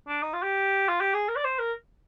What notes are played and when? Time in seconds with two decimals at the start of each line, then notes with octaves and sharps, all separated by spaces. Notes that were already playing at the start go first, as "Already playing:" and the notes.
0.08 D4
0.22 D#4
0.33 F4
0.43 G4
0.89 F4
1.01 G4
1.14 G#4
1.29 A#4
1.36 D5
1.44 C5
1.59 A#4